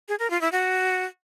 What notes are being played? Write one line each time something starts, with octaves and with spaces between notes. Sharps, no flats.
G#4
A#4
F4
E4
F#4